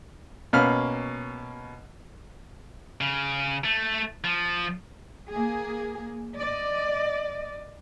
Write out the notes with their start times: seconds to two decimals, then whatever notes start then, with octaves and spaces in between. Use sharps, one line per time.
0.53 B2 A#3 C#4 B5 F6
3.01 C#3
3.64 A3
4.24 F3
5.30 A#3 G#4
6.36 D5 D#5